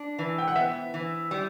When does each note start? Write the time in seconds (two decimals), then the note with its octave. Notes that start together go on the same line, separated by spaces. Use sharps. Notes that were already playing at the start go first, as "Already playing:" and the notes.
Already playing: D4
0.19 E3
0.38 G5
0.48 F#5
0.56 B3 E5
0.94 E3
1.31 G3